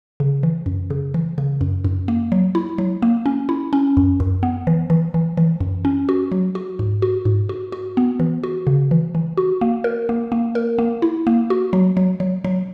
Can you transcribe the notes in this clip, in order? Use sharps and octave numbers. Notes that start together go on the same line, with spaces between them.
C#3
E3
F#2
C#3
E3
C#3
F#2
F#2
A#3
F#3
E4
F#3
A#3
C#4
E4
C#4
F#2
F#2
B3
E3
E3
E3
E3
F#2
C#4
F#4
F#3
F#4
G#2
F#4
G#2
F#4
F#4
B3
E3
F#4
C#3
E3
E3
F#4
A#3
A#4
A#3
A#3
A#4
A#3
E4
A#3
F#4
F#3
F#3
F#3
F#3